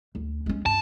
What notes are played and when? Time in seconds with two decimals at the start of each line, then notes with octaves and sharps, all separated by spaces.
0.15 D2
0.46 G#3 C#4
0.66 G2 F4 A5